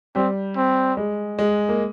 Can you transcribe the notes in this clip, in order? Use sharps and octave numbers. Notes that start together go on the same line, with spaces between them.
G3 C4
C4
G#3
G#3
A#3